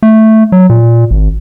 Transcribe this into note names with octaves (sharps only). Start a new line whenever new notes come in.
A3
F#3
A#2
G#1